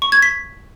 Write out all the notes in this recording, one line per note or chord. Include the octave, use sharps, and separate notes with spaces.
C#6
G#6
B6